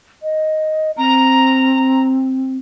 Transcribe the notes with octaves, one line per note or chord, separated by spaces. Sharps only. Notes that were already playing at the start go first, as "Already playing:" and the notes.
D#5
C4 A#5